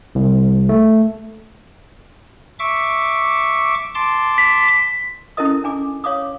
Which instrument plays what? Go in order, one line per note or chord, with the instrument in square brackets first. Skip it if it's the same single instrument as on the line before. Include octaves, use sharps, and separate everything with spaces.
[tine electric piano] C2
A3
[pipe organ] E5 C#6 D6
A5 C6 D6
[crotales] B6
[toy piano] C#4 E4 A4 A#4 D#5 D#6
D4 G#5 D6
C#5 F5 D6 D#6